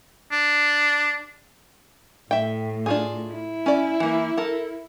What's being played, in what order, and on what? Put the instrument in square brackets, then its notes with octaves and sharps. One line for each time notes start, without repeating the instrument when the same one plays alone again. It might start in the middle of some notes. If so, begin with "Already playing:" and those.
[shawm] D4
[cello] A2 [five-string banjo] E5 G5
[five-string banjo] D4 F4 G#4
[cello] E4
[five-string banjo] C#4 D5
E3 A#3
A4 A#4